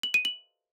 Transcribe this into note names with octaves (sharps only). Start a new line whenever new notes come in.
F#7
D#7
F#7